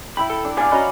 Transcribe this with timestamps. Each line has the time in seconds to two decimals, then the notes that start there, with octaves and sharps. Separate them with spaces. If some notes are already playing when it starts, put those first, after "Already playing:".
0.17 E4 G5 B5
0.30 A4
0.45 D4
0.57 B3 G4 D5 F5 G#5
0.71 C#4 F#4 B4 D#5 A#5